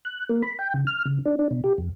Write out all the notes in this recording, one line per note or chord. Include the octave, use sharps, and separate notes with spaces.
F#6
A#3
B5
G5
C#3
F6
C#3
D4
D4
B2
G4
F2